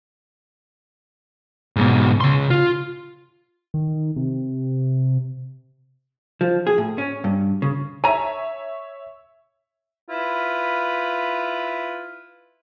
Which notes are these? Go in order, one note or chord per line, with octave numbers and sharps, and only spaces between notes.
G#2 B2
C#3 C6
F4
D#3
C3
F3
G#4
A2
C#4
G2
C#3
C#5 E5 G#5 A#5
E4 F4 B4